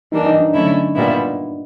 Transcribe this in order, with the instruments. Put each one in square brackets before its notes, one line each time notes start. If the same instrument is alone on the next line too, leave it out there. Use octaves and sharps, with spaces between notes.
[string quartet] E3 G3 A#3 D4 [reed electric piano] D#4
[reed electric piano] D#4
D4
[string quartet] D3 F#3 A3 C#4 E4
A#2 G3 B3 E4